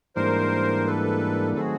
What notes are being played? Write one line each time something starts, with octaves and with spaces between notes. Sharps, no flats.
G#2 E3 G3 A#3 D4 A#4 C5
A4 B4
D#3 F#3 A3 C4 F#4 G#4